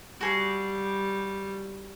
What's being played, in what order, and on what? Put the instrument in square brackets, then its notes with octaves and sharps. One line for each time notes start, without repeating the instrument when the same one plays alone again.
[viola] G3 [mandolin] F#4 G#4